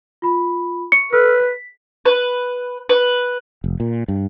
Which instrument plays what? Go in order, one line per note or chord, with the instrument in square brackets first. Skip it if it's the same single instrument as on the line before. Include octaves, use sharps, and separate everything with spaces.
[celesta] F4 B5
[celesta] C#6 [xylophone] C#7
[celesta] A4 E6 F6 [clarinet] B4
[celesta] B6
[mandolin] B4
B4
[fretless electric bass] F1
A#2
G2